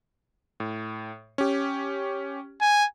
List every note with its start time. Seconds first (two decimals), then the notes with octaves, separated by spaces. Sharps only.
0.60 A2
1.38 C#4 G4
2.61 G#5